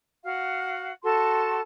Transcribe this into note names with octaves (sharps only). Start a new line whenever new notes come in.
F#4 F5 F#5
F#4 A4 A5 C6